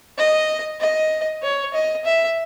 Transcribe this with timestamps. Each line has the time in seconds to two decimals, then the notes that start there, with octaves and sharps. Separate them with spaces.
0.18 D#5
0.81 D#5
1.43 C#5
1.74 D#5
2.05 E5